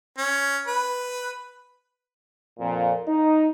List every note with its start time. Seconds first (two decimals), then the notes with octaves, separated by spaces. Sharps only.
0.18 C#4
0.67 B4
2.60 F2 A#2
3.07 D#4